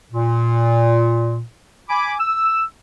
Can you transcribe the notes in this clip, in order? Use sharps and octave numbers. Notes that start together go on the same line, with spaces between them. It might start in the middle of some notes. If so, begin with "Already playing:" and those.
A#2
G#5 B5 D6
E6